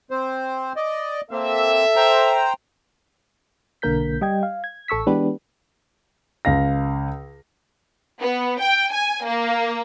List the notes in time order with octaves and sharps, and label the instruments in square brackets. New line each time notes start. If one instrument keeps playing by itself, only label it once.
[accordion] C4 C5
D5 D#5
[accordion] A#3 C4 [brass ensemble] A4 E5
[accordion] C5 G5 A#5
[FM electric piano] B1 D3 A#3 A#4 G6 B6
G3 D#5 G5 G#6
F5
G#6
A1 A4 C#6 E6 B6
E3 G#3 B3 D4 G4 B4
[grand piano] C#2 F5 A#6
[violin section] B3
G5
G#5
A#3